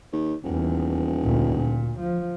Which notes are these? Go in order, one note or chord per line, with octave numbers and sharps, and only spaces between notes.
D#2
D#1 E2
D2 A#2
A#2
F3